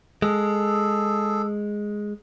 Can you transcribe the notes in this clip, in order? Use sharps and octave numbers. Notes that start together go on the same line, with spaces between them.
G#3 G#4 A4